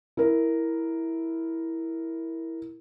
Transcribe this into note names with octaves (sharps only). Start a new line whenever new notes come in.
E4 A#4